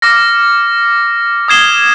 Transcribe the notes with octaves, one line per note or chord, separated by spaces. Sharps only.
D6 F6 A#6 C#7
D#6 G#6 C7 E7 G7